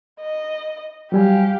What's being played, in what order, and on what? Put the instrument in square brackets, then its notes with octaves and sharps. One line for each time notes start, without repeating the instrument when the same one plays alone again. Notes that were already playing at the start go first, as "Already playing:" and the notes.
[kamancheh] D#5
[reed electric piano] F#3 G3 G#5 [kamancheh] G4 F5